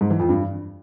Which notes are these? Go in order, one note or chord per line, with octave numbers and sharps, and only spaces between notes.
G#2
E3
F2
G2